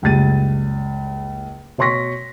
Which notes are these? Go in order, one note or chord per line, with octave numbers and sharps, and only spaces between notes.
F#1 C#2 G3 A6 D#7
B2 C#5 C6 C#6 A#6 B6